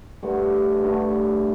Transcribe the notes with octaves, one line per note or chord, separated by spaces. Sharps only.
G2 D3 A3
G2 D3 A3